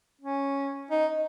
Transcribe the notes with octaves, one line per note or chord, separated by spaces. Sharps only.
C#4
D#4